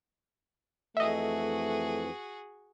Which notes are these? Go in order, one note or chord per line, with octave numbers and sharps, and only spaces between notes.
F2 E3 A3 F#4 G#4 D#5 E5